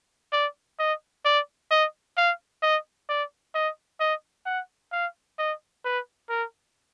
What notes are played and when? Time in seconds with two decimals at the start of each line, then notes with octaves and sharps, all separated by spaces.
0.33 D5
0.79 D#5
1.25 D5
1.71 D#5
2.17 F5
2.63 D#5
3.09 D5
3.55 D#5
4.00 D#5
4.46 F#5
4.92 F5
5.39 D#5
5.85 B4
6.30 A#4